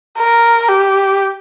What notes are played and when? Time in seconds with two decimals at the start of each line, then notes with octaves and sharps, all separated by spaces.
0.18 A#4
0.68 G4